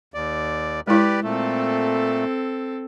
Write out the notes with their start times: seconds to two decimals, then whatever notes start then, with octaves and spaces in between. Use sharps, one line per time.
0.14 D#2 D5
0.87 G#3 E4 G4 B4 D5
1.24 A#2 A3 C4 A4